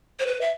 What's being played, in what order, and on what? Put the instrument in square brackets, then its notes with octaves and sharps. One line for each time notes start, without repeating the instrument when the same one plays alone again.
[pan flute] C5
B4
E5